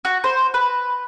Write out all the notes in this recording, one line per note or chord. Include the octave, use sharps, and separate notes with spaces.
F#4
C5
B4